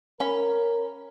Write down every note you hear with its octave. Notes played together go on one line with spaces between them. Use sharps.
C#4 A#4 B5